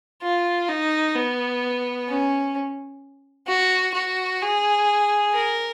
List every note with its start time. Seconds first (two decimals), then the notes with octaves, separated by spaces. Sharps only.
0.23 F4
0.68 D#4
1.15 B3
2.08 C#4
3.48 F#4
3.94 F#4
4.42 G#4
5.34 A#4